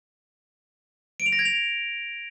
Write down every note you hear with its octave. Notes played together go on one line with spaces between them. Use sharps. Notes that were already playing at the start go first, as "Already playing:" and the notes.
D7
F7
A#6
G#6
F7